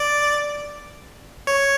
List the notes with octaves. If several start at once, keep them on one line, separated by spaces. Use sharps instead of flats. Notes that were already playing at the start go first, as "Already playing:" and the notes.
Already playing: D5
C#5